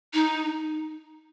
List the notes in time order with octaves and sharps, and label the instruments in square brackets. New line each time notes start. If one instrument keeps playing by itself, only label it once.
[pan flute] D#4